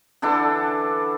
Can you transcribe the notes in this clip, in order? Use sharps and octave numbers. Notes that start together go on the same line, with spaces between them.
D3 E3 D4 A4